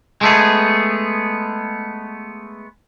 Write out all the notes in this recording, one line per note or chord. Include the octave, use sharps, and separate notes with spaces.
G#3 A3 B3 G#4